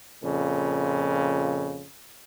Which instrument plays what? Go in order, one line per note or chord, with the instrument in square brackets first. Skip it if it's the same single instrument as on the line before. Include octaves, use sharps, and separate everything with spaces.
[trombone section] F2 A#2 C#3